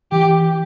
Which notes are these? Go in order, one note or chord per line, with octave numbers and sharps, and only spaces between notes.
E3 G4